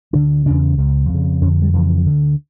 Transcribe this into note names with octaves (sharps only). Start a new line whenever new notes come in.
D2 D3 D4
E2 C#3 D4
C#2 C#3
F2
C#3
F2 D3 C#4
G3
F2 C#3 E3
D2 D3